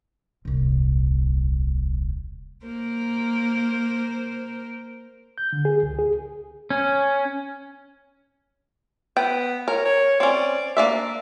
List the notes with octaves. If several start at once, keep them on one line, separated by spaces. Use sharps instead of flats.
D#1 C2
A#3 A#4 C5
G6
D3
G#4
C#2
G#4
C#4
B3 G5
A#4 C#5
C#5
C4 C#4 D5
A#3 D4 D5 E5